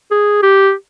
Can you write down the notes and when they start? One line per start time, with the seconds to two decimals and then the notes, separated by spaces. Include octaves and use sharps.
0.11 G#4
0.43 G4